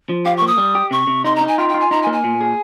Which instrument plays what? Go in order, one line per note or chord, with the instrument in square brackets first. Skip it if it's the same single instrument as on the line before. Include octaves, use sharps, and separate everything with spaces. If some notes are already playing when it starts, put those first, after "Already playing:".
[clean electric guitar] F3
[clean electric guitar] G4 [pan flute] F5
[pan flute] C#6
[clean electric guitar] A#3
[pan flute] D#6
[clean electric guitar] G3
G4
[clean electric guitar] C3 [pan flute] C#6
[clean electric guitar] C3
[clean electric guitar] D#4 [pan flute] C6
[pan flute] A#5
[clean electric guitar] D#4
[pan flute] G#5
[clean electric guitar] F4 [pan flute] G5
[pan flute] G5
[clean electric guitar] F4
[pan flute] G#5
[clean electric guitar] D#4 [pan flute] A#5
[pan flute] G#5
[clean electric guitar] A#3
[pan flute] G#5
[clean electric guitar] A#2
G#4